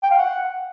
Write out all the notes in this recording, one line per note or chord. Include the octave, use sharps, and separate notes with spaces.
G5
F5
F#5